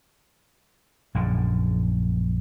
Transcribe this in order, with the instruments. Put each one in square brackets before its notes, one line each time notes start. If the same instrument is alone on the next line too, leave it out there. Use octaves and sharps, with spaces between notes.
[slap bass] A#1 F#2 D3